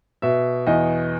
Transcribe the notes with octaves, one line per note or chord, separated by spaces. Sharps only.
B2 E5
E2 D#5